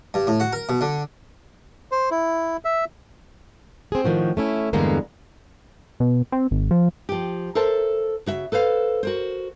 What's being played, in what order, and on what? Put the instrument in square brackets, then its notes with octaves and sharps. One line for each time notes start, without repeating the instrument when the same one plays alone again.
[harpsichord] G2
A2
F#4
A#4
B2
D3
[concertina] C5
E4
E5
[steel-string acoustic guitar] C4 G#4
A2 D#3 F3 F#4
A3 C#4 E4
E2 G2 D3 G#3 A#3 B3
[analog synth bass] B2
C4
G#1
F3
[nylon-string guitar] F3 G4
A4 A#4 C5 E5 A5
C#3 F#4 E5
A4 B4 C5 F5
F#4 A#4 C5